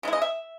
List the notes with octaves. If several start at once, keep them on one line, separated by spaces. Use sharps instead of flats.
C#3 G#3 E4
D#5
E5